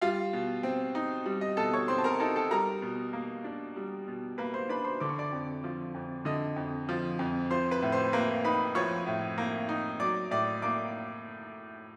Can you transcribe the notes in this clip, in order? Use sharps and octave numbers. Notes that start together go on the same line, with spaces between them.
G3 F4 F5
B2
C4
D#4
G3
D#5
B2 A4 A5
C#5 C#6
C4 C5 C6
A5
A#4 A#5
D#4 A4 A5
A4 A5
G3 A#4 A#5
B2
A#3
D4
G3
B2
A#3 B4 B5
C5 C6
D4 B4 B5
C5 C6
D3 D6
C#6
D5 D6
F2
F3
F2
D3 D#5 D#6
F2
F3
F2
F3 C5 C6
B4 B5
A2
C5 C6
A#3 B4 B5
D#4 B4 B5
F3 C#5 C#6
A2
A#3
D#4
F#3 D5 D6
A2 D5 D6
A#3 D5 D6